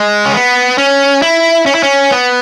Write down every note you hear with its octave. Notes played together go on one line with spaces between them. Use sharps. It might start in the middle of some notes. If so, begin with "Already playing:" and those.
Already playing: G#3
C#4
B3
C#4
E4
C#4
E4
C#4
B3